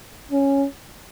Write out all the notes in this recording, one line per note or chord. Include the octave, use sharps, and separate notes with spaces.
C#4